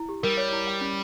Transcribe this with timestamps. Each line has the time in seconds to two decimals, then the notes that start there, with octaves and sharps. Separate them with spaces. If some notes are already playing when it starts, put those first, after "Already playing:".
Already playing: E4
0.09 G4
0.23 G3 A#4
0.37 C#5
0.52 E4
0.67 G5
0.81 C#4